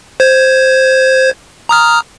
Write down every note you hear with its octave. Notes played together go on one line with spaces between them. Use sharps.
C5 G#6
A#5 D#6 F6